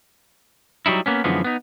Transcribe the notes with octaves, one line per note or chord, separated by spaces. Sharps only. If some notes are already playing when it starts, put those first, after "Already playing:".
F#3 G3 D#4 E4
A#3 B3 C#4
F#2 D3 E3 F3 G#3 B3
B3 D#4